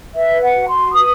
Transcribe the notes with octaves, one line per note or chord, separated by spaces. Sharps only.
B4 E5
F#5
F#4
C6
B4 D#6